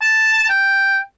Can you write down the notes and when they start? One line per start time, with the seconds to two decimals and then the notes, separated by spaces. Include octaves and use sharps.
0.02 A5
0.49 G5